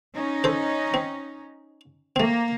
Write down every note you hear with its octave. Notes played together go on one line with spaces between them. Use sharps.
C#4 D#4
A4 C5
C4
A3 A#3 C4